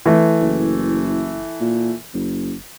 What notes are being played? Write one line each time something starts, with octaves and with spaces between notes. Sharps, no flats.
E3 A3
F#1
A#2
F#1